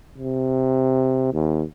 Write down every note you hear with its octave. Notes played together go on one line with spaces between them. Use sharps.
C3
D#2